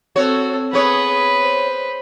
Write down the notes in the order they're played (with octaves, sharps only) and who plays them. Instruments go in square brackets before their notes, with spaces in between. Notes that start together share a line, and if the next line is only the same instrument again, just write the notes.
[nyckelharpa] C4 A4 [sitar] F#4 C#5
[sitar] B3 C#5 [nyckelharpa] G#4 D#6 [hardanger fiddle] B4
[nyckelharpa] C5